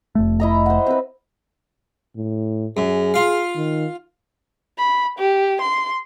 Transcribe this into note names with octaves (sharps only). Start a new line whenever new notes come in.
F1 A3
E4 D#5 A#5
C5 F#5
C4 B4
A2
F#2 G#4
F4 F5
D#3
B5
G4
C6